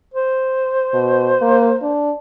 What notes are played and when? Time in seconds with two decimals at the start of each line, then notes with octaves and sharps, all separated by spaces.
0.14 C5
0.94 B2
1.42 A#3
1.82 D4